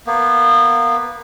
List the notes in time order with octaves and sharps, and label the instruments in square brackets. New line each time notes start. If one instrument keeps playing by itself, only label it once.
[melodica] A#3 B3